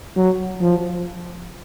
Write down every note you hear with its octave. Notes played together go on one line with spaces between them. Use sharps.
F#3
F3